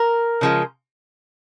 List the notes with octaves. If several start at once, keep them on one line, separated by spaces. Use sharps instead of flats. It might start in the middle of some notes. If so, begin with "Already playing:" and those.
Already playing: A#4
C#3 F3 G#3